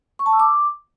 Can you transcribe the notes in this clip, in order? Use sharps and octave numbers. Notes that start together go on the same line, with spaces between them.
C#6
A5
E6
D6